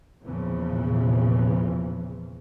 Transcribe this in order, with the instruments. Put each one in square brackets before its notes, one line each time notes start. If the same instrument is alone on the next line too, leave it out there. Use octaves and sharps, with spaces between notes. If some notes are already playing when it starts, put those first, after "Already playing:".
[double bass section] E2 A#2 C#3 E3 F3